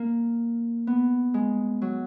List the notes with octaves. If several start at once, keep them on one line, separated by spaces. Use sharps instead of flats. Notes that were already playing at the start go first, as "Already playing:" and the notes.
Already playing: A#3
B3
G#3
F#3